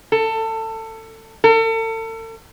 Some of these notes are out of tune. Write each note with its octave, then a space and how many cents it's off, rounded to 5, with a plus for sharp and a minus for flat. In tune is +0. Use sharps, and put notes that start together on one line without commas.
A4 +25
A4 +40